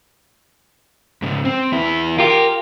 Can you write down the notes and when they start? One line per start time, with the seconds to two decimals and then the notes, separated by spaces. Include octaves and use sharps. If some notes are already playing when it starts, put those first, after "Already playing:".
1.22 G#2 C#3
1.45 C4
1.72 E2 E4
2.18 F4 G4 A#4